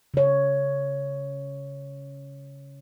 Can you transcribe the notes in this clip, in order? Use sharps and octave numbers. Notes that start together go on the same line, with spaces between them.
C#3 C#5